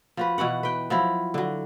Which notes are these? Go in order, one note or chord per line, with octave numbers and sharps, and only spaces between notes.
F3 F#4 B4
B2 E3 F#4 F#5
B4 G5
F3 F#3 E4
D3 F#3